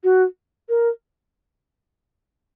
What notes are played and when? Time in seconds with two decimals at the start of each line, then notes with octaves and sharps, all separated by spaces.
0.04 F#4
0.69 A#4